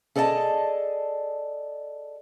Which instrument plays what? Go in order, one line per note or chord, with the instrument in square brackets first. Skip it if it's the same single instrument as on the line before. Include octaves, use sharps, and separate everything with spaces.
[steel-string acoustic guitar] G#4 A4 D5 D#5 F#5 A5